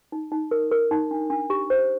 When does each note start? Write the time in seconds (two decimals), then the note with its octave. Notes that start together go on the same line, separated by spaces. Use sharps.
0.12 D#4
0.32 D#4
0.51 A#4
0.71 A#4
0.91 D#4
1.11 D4
1.30 D4
1.50 G4
1.70 C5